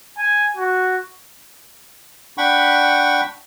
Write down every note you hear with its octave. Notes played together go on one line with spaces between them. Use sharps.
G#5
F#4
D4 F#5 G5 B5 C#6